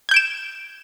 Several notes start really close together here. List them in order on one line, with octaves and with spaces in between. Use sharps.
G#6 G6 D7 E7